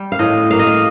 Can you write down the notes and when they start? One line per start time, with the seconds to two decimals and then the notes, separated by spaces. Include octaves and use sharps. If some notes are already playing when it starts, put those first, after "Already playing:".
Already playing: G3
0.12 F5
0.19 A2 D#5
0.51 A#3 F5
0.59 D#5
0.67 F5